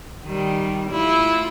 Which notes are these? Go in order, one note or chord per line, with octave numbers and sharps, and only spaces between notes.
D#3 G3
A3 E4 F4